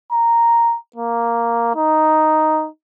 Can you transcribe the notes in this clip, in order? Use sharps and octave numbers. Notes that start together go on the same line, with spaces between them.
A#5
A#3
D#4